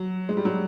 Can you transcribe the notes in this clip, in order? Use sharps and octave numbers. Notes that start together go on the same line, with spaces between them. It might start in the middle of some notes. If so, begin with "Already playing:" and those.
Already playing: F#3
G#3
G3
F#3